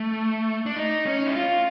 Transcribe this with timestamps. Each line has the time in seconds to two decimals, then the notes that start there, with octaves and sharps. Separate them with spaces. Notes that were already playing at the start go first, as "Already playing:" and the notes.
Already playing: A3
0.66 D4
0.76 D#4
1.06 C#4
1.26 E4
1.35 F4